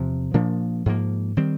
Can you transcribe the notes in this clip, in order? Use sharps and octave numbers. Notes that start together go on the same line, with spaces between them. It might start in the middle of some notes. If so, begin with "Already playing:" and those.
Already playing: E2 C3 F3
A#2 F3 A#3 D4
G#2 F3 A#3
D#3 G3 C4